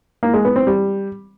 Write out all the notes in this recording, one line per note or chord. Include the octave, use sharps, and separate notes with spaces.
A#3
G#3
B3
C4
G3